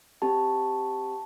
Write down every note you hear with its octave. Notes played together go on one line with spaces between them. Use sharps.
C4 G4 A5